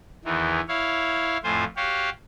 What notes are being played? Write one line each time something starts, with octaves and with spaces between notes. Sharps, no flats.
E2 D#3 E3
E4 C#5 F5
F2 A2 F4 C5 G#5
F#4 G4 C#5 F5